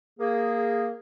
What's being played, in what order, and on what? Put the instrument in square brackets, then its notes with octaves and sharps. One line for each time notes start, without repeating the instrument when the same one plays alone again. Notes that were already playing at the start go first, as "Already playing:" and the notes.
[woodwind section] A#3 G#4